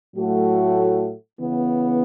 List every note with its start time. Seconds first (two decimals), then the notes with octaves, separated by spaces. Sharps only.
0.15 A2 F#3 A3 F#4 A4
1.39 C#3 E3 B3